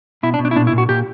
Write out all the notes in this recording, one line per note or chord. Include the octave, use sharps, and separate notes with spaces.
B2 E4
D4
B2
D4
E4
A#2 D4
E4
A#2
F#4
A#2 G4